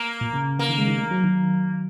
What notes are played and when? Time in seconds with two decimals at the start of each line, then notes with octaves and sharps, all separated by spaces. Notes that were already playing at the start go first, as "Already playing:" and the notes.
Already playing: A#3
0.21 A#2
0.33 C#3
0.59 C#3 A#3
0.69 D#3
0.78 G#3
0.88 D#3
0.98 G#3
1.11 F#3
1.24 D#3